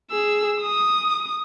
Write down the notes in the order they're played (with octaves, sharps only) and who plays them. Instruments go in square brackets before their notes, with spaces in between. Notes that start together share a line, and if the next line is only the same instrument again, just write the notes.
[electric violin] G#4 E6
D#6